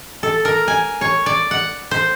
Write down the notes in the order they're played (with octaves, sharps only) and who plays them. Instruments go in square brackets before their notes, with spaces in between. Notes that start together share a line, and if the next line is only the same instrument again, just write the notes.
[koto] A4
A#4
G#5
C#5
D5
F#5
C5